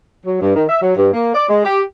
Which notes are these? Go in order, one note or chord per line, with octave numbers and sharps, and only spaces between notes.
F#3
G2
D#3
E5
F#3
G2
A#3
D5
G#3
G4